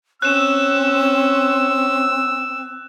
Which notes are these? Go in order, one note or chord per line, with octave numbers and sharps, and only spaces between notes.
C4 C#4 E6 F#6 E7